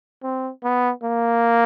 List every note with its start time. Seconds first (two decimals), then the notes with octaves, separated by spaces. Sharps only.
0.23 C4
0.63 B3
1.03 A#3